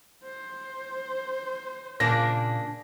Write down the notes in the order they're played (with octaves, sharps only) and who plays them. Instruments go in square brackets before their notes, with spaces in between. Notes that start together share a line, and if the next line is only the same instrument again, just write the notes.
[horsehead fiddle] C5
[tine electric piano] A#2 [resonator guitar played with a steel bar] C#3 A#3 D4 [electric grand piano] A#6